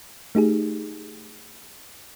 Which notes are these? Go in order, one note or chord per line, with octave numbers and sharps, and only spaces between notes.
A3 D#4 G4 G#4